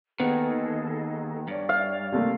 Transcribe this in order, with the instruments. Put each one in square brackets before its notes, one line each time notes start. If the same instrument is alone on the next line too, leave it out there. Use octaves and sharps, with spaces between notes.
[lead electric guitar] D#2 D#3 [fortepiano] B3 [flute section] G#4 A4 D#5
[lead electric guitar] G2 [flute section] C#5 D5
[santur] F5
[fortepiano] C3 A3 A#3